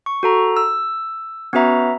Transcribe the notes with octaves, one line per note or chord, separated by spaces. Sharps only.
C#6
F#4 A4 A#5
E6
B3 C#4 F#4 B4 E5 A#5